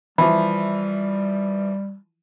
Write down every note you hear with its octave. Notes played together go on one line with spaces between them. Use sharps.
E3 F3 G3 E5 B5